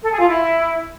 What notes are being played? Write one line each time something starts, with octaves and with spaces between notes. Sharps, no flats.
A4
G#4
F4
E4